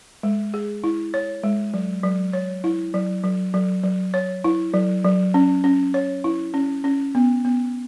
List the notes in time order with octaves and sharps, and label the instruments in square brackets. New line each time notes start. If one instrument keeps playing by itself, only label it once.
[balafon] G#3
G#4
E4
C#5
G#3
F#3
F#3
C#5
E4
F#3
F#3
F#3
F#3
C#5
E4
F#3
F#3
C#4
C#4
C#5
E4
C#4
C#4
B3
B3